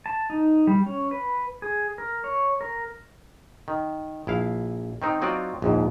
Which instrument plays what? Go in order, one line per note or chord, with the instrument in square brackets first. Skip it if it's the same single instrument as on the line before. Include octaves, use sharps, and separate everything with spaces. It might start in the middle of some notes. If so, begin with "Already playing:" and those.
[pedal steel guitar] A5
D#4
G3
C#4
B4
G#4
A#4
C#5
A#4
[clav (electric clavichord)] D#3
A#1 E4 F5
D#3 C4 D#4
F#3 C4 D#4 F4 F#4 D5
A#1 D#2 G#2